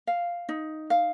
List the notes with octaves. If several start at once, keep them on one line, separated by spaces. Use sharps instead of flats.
F5
D#4
F5